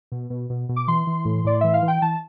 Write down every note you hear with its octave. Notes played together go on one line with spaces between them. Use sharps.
B2
B2
B2
B2
D6
E3 C6
E3
A2
A2 D5
E3 E5
F5
E3
G5
E3 A5